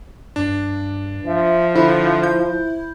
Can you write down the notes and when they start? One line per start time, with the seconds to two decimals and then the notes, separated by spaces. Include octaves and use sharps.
0.36 G2 D4
1.26 F3 E5
1.75 D3 E4 C5
2.23 G6